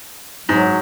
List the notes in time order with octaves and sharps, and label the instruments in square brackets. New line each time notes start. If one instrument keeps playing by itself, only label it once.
[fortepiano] G#2 [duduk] F#3